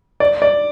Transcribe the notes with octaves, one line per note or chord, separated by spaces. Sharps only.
D5
D5